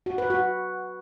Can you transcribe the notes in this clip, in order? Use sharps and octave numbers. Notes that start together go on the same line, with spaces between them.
F#4
B4
F#4